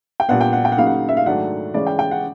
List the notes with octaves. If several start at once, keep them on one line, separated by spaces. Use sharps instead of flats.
G5
A#2 G3 B3 D4 F#5
G5
F#5
G5
F#5
C#3 F#3 A#3 D#4 F5
F#5
E5
F5
G#2 D#3 F#3 A3 D4 F#5
C#3 E3 G#3 C#4 D5
G5
G5
F#5